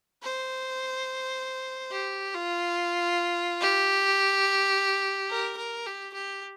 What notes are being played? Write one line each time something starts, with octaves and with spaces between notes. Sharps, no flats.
C5
G4
F4
G4
A#4
A#4
G4
G4